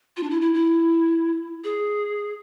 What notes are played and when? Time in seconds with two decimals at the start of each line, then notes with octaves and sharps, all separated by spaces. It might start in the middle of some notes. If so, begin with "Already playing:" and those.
0.17 F4
0.23 D4
0.30 E4
0.42 E4
0.54 E4
1.64 G#4